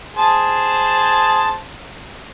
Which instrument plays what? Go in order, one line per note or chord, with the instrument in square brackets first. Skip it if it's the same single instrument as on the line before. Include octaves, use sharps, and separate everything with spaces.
[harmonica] G#4 C5 A5